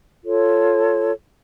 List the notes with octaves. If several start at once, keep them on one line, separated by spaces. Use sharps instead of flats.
F4 A4 C#5